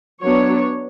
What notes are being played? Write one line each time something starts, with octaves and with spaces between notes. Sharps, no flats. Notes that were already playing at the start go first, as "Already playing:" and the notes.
F#3 B3 D4 C#5